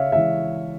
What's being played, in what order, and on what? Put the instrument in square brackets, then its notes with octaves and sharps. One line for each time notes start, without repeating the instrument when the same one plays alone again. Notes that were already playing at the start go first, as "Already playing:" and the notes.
Already playing: [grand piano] C#3 C#5 E5 F5
E3 G#3 E5